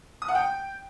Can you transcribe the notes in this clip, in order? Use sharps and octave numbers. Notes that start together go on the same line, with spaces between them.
D#6
F#5
G5